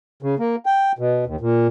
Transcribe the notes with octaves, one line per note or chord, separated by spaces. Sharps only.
C#3
A#3
G5
B2
D#2
A#2